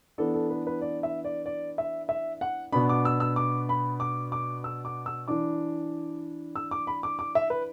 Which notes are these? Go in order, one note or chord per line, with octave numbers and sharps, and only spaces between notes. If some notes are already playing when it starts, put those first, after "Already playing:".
E3 B3 D4 A4
A4
B4
B4
D5
E5
D5
D5
E5
E5
F#5
B2 B3 D4 B5
D6
E6
E6
D6
B5
D6
D6
E6
D6
E6
E3 D4 D6
E6
D6
B5
D6
D6
E5
B4